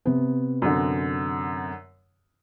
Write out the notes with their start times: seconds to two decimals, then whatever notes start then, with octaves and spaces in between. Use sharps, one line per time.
0.06 C3 B3
0.62 F#2 D3